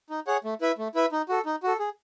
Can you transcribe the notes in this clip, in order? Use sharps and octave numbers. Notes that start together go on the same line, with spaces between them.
D#4
G#4 C#5 F#5
A3
E4 B4 E5
A3
E4 B4 E5
D#4
F#4 A4
D#4
F#4 A4
G#4